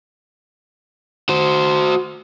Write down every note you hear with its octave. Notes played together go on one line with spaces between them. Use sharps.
F#4 C5